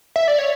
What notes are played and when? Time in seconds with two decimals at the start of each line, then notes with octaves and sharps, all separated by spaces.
0.16 E5
0.28 D5
0.38 C#5